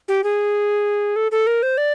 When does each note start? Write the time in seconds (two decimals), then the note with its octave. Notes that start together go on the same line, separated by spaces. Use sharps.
0.08 G4
0.24 G#4
1.16 A4
1.31 A4
1.47 A#4
1.62 C5
1.77 D5